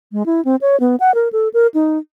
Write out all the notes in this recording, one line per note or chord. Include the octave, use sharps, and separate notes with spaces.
G#3
E4
C4
C#5
B3
F#5
A#4
A4
A#4
D#4